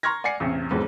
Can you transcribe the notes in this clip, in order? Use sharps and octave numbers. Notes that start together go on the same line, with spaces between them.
A#5 C6 C#6 F6 G#6 A#6
D5 F#5 G#5 C7 C#7
A1 E2 C3
E1 F2 G#2 B3